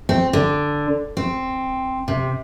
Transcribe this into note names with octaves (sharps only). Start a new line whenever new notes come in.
C4
D3
C4
C3